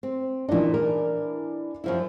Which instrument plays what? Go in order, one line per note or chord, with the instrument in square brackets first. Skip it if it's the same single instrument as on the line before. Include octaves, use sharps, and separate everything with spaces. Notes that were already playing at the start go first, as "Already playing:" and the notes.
[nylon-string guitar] C4
[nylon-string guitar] A#2 D#4 [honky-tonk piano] E3 D4
[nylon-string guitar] A#4
F#2 F3 E4